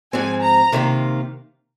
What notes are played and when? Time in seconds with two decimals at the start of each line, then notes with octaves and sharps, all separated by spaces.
0.13 G#2 F3 C4 G#5
0.42 A#5
0.72 C3 D#3 A#3 F4